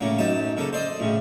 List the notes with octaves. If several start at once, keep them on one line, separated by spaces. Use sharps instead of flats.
A2 C#3 A#3
F#2 D#4 A5
C#3 A#3 A4
C5 D5 D#5
A2 C#3